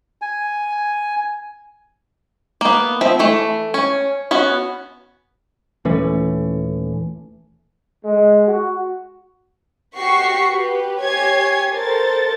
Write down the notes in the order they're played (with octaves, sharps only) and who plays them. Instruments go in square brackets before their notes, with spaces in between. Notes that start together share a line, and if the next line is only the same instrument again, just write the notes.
[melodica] G#5
[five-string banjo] A#3 B3
F3 C4 E5
E3 A3
C#4
B3 C#4 F#4
[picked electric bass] D#1 E3 A3 C#4
[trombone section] G#3
F#4
[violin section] F#4 G4 C#6 B6 C7
G4 B4
G4 C#5 G#5 G#6 C7
A4 A#4 C5 A6